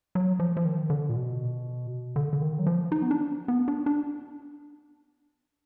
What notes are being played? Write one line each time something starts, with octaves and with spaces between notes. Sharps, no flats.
F#3
F3
F3
D#3
D3
A#2
B2
D3
D3
D#3
F#3
F3
D#4
B3
D4
B3
D4
D4